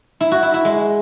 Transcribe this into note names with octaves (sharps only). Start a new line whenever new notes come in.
E4
F#4
E4
E4
G#3